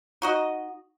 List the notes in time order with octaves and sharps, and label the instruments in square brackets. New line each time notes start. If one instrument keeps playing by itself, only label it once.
[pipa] D#4 F#4 D#5